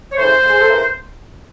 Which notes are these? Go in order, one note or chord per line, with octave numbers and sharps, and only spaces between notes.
C#5
C#3 E3 A3 C5
F2
G#4
A4
C#3 E3 A3 A#4